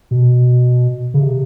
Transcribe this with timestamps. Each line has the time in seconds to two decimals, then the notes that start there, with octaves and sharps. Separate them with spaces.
0.11 B2
1.14 C#3
1.21 C3